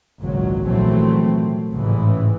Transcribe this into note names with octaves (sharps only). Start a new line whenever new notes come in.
G#1 C#2 A#2 F#3
A#1 C3 E3 F#3 A3 C4
A1 G#2 C#3 E3